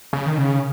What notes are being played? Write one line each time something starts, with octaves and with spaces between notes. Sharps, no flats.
C#3
D#3
C#3